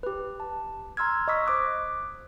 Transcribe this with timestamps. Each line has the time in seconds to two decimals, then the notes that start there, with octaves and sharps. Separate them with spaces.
0.03 G4 B4
0.40 A5
0.97 A#5 C6 E6 F6 G#6
1.28 D#5 B5 C#6 D#6 E6 B6
1.46 C5 D6 F#6